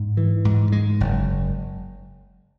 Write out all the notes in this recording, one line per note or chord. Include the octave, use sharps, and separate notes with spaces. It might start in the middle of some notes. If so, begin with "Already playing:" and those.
Already playing: G#2
E3
G#2
G#3
F#1